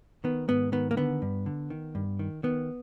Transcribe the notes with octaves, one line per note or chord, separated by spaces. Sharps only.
D#3 B3
G#2 B3
D#3 B3
A#3
D3 B3
G2
D3
D#3
G2
D#3
D#3 B3